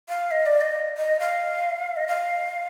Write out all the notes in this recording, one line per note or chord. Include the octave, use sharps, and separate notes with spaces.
F5
D#5
D5
D#5
D#5
F5
D#5
F5